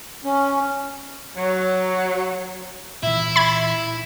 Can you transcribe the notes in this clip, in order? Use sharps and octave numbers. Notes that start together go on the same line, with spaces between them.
C#4
F#3
A#2 E3 E4 E5
B5 G#6